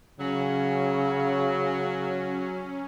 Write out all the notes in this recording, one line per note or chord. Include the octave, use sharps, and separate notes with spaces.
C#3 F#3 C#4